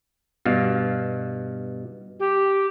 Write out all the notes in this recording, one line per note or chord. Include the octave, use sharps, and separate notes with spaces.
G2 B2 F5
G4